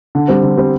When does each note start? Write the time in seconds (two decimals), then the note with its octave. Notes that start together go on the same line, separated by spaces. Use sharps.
0.15 D3
0.28 G3 C4
0.43 D3
0.57 G3 C4